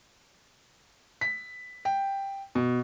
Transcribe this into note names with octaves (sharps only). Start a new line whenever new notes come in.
B6
G5
B2